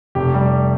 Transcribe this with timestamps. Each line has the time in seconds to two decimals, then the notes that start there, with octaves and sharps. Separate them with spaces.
0.15 F1 G4
0.34 G3